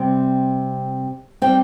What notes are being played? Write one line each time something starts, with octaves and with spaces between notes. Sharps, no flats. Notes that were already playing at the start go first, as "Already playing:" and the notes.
Already playing: C3 G3 C4
G3 C4 G5